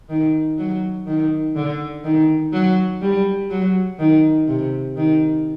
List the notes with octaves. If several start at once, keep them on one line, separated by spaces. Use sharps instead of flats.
D#3
F#3
D#3
D3
D#3
F#3
G3
F#3
D#3
C3
D#3